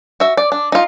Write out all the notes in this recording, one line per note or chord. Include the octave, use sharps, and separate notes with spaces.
F#4 E5
D5
D4
D#4 F4